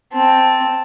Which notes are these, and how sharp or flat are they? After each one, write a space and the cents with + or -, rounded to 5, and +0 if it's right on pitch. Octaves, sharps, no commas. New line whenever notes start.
C4 +0 A5 +0